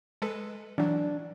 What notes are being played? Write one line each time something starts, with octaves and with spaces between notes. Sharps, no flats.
G#3 A4 B4
E3 F#3 D4